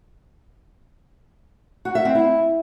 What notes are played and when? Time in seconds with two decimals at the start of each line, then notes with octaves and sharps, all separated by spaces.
1.85 F#4
1.95 E5
2.05 C4
2.15 E4